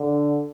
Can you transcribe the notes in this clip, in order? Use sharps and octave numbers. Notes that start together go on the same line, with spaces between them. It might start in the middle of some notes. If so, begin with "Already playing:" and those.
Already playing: D3